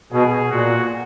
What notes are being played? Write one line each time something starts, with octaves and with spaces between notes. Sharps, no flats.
B2 G#4
A#2 F#4